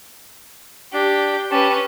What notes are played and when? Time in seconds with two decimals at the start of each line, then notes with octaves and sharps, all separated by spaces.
0.93 D4 G4
1.51 C#4 G4 B4 A5